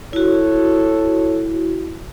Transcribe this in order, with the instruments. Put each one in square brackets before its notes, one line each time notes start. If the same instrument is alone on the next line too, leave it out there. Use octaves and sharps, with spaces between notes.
[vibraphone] E4 F#4 [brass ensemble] A4 C#5